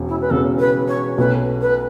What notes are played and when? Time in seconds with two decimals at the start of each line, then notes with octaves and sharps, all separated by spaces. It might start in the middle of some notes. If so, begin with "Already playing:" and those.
Already playing: E1 E2 C#3
0.09 E4
0.21 B4
0.30 E1 E2 C#3 A4
0.59 B4
0.88 C#5
1.18 B1 B2 A3 C#4 B4
1.62 B4